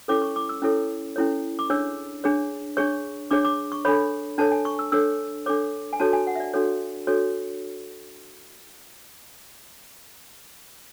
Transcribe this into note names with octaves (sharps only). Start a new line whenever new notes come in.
C#4 E4 A4 C#5 D6
C#6
D6
E6
C#4 E4 A4 C#5
C#4 E4 A4 C#5
D6
D4 G#4 C#5 E6
D4 G#4 C#5
D4 G#4 C#5 C#6
D4 G#4 C#5 D6
D6
C#6
D4 A4 C#5 B5
D4 A4 C#5 A5
G#5
C#6
E6
D4 A4 C#5 E6
D4 A4 C#5 D6
G#5
D4 F#4 A4 C#5 A5
G#5
F#5
E5
D5
D4 F#4 A4 C#5
D4 F#4 A4 C#5